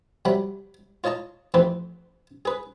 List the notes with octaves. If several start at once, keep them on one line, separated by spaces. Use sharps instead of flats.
C3 F#3 G3 B5
F4 C#5 D#5 A5 A#5
A1 F2 C4 B4 C5
G#4 B4